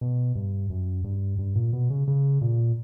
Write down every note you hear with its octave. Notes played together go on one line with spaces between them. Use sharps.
B2
G2
F#2
G2
G2
A#2
B2
C#3
C#3
A#2